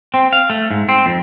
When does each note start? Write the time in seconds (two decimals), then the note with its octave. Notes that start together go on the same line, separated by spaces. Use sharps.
0.14 C4
0.33 F5
0.50 A3
0.71 G#2
0.89 C4
1.06 F2